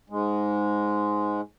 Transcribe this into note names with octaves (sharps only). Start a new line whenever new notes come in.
G#2 G#3